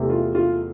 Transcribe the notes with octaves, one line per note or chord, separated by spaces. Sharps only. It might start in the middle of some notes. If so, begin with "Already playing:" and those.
Already playing: E2 C3 E3 A3
F4
F4